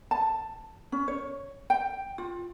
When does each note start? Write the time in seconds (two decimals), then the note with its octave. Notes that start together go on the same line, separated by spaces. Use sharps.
0.11 A5
0.92 C#4
1.08 C#5
1.70 G5
2.18 F4